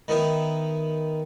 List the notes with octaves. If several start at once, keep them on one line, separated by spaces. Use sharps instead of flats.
D#3 B3 E4